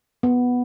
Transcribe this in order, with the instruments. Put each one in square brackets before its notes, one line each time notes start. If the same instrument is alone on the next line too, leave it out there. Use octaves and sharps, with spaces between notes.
[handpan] B3